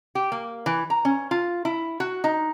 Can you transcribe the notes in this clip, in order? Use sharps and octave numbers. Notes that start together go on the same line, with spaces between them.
G4
A#3
E3
A#5
C#4
F4
E4
F#4
D#4